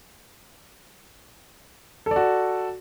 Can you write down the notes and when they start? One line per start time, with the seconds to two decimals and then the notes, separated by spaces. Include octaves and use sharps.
2.06 A4
2.11 D5
2.16 F#4